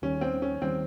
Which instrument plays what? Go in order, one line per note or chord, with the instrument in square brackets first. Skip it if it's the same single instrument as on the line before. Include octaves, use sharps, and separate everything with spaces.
[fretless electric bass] D#2 D#3 G3 [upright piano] C#4
[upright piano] C4
C#4
[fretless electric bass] D#2 D#3 G3 [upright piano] C4